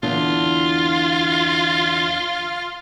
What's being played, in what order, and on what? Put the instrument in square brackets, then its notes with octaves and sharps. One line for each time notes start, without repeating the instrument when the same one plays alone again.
[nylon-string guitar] E2 D3 D4 [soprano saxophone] F4